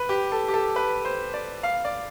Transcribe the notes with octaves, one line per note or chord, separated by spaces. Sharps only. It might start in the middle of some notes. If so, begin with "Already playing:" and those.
Already playing: B4
G4
A4
G4
A4
B4
C5
D5
F5
D5